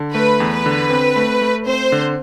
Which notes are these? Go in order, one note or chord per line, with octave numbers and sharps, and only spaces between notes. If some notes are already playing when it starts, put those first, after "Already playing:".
Already playing: D3
A3 B4
E2
B4
D3
C4
A3
A3
C4 C5
D3